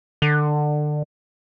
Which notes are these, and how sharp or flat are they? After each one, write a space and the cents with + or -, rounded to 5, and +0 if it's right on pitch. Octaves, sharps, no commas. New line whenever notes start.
D3 +25